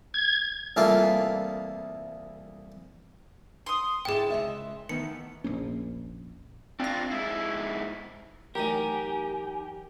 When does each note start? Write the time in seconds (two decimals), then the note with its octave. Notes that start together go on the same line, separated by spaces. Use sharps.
0.14 G#6
0.76 C2 E3 A3 A#3 F4 D6
3.66 C6 D#6
4.05 G#2 D3 G#3 E4 G#4 G5 A6 E7
4.30 C#2 G#3 D#5 E5
4.89 D#3 E3 A3 B3 C#7
5.44 F1 A#1 A#3 C#4
6.80 C4 D4 F4 A#6
7.11 G#2 E4
8.55 A1 A2 F#3 D#4 G4 A#4 G#5